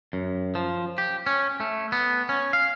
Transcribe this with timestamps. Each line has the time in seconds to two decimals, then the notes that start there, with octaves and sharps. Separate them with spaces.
0.13 F#2
0.55 F3
0.98 G4
1.27 C#4
1.60 A3
1.92 B3
2.29 C#4
2.53 F5